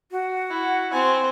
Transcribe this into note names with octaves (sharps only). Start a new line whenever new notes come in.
F#4
E4
C4 G#5